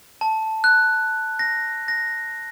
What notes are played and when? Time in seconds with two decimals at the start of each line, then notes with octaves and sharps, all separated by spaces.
0.21 A5
0.64 F#6
1.39 A#6
1.88 A#6